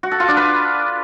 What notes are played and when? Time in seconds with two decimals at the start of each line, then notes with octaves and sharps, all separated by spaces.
0.03 F#4
0.12 A4
0.20 F4
0.28 D4
0.37 B4